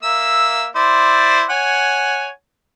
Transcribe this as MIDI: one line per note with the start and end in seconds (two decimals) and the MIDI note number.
0.03 0.67 58
0.03 0.67 76
0.03 0.67 88
0.76 1.44 64
0.76 1.44 72
0.76 1.44 74
1.50 2.29 73
1.50 2.29 78
1.50 2.29 80